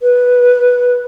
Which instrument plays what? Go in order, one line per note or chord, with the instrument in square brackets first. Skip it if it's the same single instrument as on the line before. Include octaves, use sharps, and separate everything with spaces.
[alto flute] B4